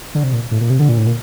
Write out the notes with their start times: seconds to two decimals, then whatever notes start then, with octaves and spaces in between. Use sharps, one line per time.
0.15 D3
0.24 C3
0.33 A#2
0.51 A2
0.61 A#2
0.70 C3
0.79 D3
0.89 A#2
0.97 A2
1.06 A#2